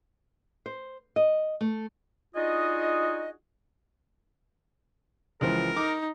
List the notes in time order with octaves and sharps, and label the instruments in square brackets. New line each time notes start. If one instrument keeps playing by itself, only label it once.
[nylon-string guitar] C5
D#5
A3
[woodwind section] D4 D#4 F4 F#4 G#4 D#5
[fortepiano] C#2 E3 F3 [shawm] A#4
[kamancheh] D#4 [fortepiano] D6